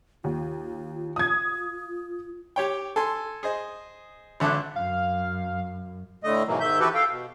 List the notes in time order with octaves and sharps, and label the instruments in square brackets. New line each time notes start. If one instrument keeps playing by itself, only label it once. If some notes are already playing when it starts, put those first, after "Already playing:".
[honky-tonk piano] D#2 [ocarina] F4
[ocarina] F4 [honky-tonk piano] D#6 G#6
[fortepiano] G4 C#5 G5
A4 G#5 C6
G#4 C5 D#5
G#1 D3 E5 A5 D6 F#6
[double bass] F#2 [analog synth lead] F5
[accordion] A2 D3 A3 D#5
G#2 B2 E3 F#3 A#3
G#2 D#3 E5 G6
E3 F#4 G4 A4 B4
A4 F5 G5
B2